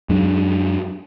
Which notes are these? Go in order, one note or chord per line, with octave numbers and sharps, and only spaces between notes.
F#2 F#3 G#3 D4